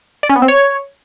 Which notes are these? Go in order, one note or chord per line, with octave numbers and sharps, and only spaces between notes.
D5
C#4
B3
C4
C#5